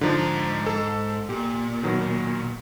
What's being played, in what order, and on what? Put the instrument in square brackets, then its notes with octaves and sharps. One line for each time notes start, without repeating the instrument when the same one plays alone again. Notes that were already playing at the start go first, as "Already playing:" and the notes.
[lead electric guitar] G#2 A#5 [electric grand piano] D3 F3 D#4
[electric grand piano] A4
[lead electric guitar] A#2 [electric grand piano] G4
[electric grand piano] B2 D#3 F#3